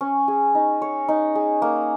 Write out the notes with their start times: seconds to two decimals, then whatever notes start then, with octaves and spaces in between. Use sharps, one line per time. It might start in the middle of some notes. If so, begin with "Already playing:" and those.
0.01 C#4
0.28 G#4
0.55 D#4
0.82 C#5
1.08 D#4
1.35 G#4
1.62 A#3